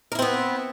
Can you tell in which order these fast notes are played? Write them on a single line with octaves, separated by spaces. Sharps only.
A#4 E4 C4 B3